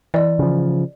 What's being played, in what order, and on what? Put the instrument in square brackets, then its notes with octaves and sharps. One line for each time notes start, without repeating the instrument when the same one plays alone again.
[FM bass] E3 [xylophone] D5 D#5
[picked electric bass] C#3 F3